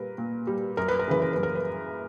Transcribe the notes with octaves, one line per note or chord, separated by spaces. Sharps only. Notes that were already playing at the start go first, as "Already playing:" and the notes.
Already playing: A#2 G3 A#4 B4
A#2
G3
F#2 A#4
B4
A#4
C#3 E3 B4
A#4
F#2 B4
A#4
B4